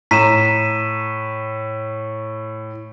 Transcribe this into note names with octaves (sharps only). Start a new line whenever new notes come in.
A2 A#5 B6 D#7 E7